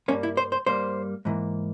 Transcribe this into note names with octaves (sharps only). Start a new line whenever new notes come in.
G2 G3 A#3 C#4
E4
C5
C5
G2 G3 A#3 C5
G#2 E3 A#3